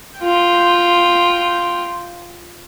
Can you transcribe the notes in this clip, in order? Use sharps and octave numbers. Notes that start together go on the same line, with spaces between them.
F4 G5